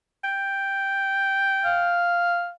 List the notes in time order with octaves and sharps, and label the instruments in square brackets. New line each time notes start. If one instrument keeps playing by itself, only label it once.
[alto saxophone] G5
[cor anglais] F5